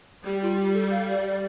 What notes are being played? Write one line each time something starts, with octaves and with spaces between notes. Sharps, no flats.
G3 G4
F4
G4
A4
F5
D5
D5